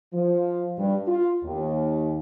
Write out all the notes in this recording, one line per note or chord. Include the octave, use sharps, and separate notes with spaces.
F3
G2
F4
D#2